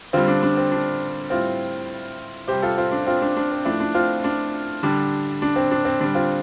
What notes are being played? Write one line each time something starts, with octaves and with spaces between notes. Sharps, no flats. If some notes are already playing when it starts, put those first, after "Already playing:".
D3 G3 C4 F4
D4
D4
C4
D4
A2 G3 C4 F4
C3 G3 G4 C5
F4 A4
C4 F4
D4
C4 F4
D4
D4
C4
A2 F3 A3 D4
D4
C4 F4
D4
D3 G3 D4
D4
C4
D4
C4
D3 G3 D4
C4 F4